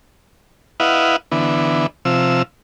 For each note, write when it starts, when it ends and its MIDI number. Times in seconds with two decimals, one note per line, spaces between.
0.80 1.16 64
0.80 1.16 71
0.80 1.16 75
0.80 1.16 77
0.80 1.16 78
1.32 1.87 50
1.32 1.87 52
1.32 1.87 59
2.05 2.42 48
2.05 2.42 53
2.05 2.42 88